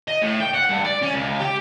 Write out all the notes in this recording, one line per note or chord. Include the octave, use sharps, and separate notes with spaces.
D#5
A2
G5
F#5
G2
D5
C#4
C#2
G4